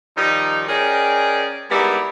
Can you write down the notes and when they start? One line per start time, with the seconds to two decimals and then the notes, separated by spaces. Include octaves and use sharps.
0.17 D#3 F3 G3 D#4
0.69 C#4 G#4 A#4 D5 D#5 G5
1.70 G3 G#3 A#3 B3 D#4 E4